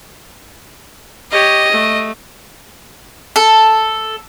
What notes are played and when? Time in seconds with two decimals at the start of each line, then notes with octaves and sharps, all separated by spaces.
1.31 G4 C#5 D#5
1.71 A3
3.36 A4